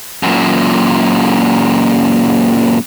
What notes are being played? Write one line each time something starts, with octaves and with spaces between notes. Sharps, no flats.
F#2 A#2